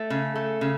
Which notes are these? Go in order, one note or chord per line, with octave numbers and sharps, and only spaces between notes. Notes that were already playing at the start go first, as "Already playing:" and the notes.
Already playing: A3
C#3
A3
C#3